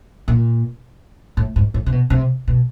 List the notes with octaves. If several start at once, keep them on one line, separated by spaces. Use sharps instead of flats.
A#2
A2
G#2
A2
C3
B2
C3
B2